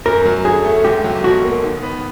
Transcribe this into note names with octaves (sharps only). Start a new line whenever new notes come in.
F#2 A#4
F#3
D3 G#4
A3
C#2 G4
F#3
B2 F#4
A#3
D#3
B3